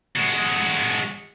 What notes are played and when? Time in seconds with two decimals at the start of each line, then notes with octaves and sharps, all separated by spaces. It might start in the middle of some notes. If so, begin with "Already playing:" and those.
0.16 G#3 F#4